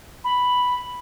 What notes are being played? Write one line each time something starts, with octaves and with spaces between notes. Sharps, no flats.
B5